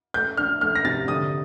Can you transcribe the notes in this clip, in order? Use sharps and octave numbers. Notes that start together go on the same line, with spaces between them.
A3 G6
D4 F6
A3 F6
A#6
C3 A6
D3 D#6